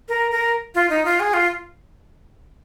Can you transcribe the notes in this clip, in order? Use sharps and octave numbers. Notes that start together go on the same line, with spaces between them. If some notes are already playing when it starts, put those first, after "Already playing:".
A#4
A#4
F4
D#4
F4
G#4
F4